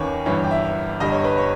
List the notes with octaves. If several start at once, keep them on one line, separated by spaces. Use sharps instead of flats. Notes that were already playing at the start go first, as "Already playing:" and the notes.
Already playing: D#2 D#3 A#3 C#4 B4 C#5
G1 G2 E3 C#5
G5
E5
G1 G2 G3 D#5
C#5
B4
C#5